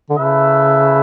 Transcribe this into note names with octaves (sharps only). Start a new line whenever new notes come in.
D3
C#3 A3 E4 B4 E5